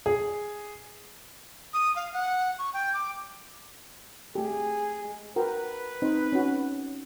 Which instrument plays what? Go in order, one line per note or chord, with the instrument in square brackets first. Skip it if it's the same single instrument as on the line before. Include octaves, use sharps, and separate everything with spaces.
[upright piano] G#4
[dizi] D#6
F5
F#5
C#6
G5
D6
[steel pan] A3 G4 [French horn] G#4
[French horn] G#3
[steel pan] F#4 A#4 G5 [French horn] B4
[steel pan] C4 D#4 C5
C#4 F#4